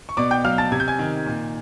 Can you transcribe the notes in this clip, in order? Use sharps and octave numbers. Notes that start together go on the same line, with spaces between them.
C#6
B2 D5 D6
G5 G6
F#3 F5 F6
A5 A6
C3 G#6
G6
G#5 G#6
D#3
A#2